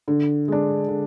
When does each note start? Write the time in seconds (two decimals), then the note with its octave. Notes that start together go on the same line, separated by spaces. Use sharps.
0.08 D3
0.48 G#3 D4
0.88 D3